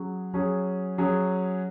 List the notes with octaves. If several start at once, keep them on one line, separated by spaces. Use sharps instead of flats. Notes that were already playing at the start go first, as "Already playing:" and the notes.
Already playing: F#3 C#4 G#4
F#3 C#4 G#4
F#3 C#4 G#4